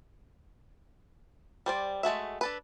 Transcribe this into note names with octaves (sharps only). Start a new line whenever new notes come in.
G3 C5 D5
G#3 A3 F#4 E5
D4 A4 B4